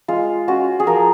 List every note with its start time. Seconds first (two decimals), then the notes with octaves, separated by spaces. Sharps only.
0.08 G#3 F4
0.48 C#4 F4 F#4
0.80 G#4
0.87 F3 A#4